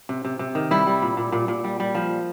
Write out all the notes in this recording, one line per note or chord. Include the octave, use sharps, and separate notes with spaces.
C3
C3
C3
D#3
G3 E4
G3
A#2
A#2
A#2
A#2
G3
G3
F3